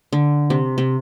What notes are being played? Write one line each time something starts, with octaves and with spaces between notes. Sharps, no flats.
D3
C3
C3